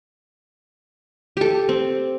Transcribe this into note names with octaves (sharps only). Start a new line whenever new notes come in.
G4 A4
C4